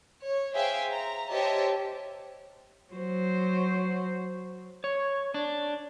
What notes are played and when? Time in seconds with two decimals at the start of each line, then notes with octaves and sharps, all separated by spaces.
0.23 C#5
0.55 G#4 C5 E5 F5 G5
0.90 A#5
1.31 G4 C5 C#5 D#5 E5 A5
2.94 F#3 C5
4.84 C#5
5.34 D4